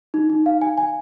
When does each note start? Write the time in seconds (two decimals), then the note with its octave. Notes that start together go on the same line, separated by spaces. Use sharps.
0.14 D#4
0.30 D#4
0.46 F5
0.62 G#5
0.78 G#5